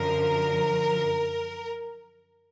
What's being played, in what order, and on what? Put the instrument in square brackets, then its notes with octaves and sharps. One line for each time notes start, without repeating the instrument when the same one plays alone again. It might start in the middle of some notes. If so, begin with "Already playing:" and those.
Already playing: [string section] F#2 D3 F3 A#4